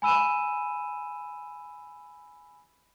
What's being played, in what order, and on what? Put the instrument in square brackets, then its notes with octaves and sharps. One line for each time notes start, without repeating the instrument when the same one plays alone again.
[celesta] G#5 B5 E6 D#7 E7